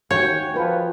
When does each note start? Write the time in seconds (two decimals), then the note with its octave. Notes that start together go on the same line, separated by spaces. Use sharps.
0.11 D#2 F#4 C#5 G5 G#5
0.54 F3 A#4 B4